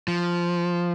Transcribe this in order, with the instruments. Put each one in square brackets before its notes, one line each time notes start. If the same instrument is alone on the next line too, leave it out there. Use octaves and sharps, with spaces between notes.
[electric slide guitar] F3